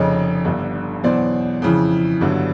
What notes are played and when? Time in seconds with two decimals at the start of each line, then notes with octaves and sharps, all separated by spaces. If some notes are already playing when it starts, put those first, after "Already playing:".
Already playing: F1 F2 C#3 C#5 D#5
0.45 G1 G2 D3
1.03 E2 B2 F#3 C5 D5
1.62 F2 C#3 E3
2.21 G1 G2 D3 F#3